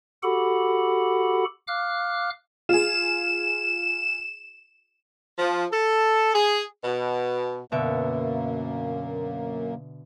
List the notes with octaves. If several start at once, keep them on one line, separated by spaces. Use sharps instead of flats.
F#4 G4 A4 F#5 B5
F5 D6 F6 F#6
F4 G#4 E7
F3
A4
G#4
B2
F#2 B2 D3 A#3 E5